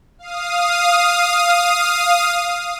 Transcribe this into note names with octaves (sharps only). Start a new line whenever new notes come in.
F5 D#6